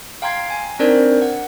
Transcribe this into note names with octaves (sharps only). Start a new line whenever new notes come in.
F5 G5 A#5 C6 G#6 C7
G#5
C4 D4 D#4 A#4 C5 D5
F#5